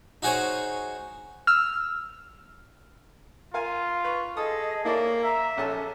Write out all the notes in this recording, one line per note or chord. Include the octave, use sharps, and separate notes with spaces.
D#4 F#4 G#4 C5 C#5
E6 F6
F4 A#4 F5 G#5
B4 C#6
G#4 A4 D#5 D#6
A#3 E4 C#5 D5 A5
E5 A#5
A#1 C#4 A4 A5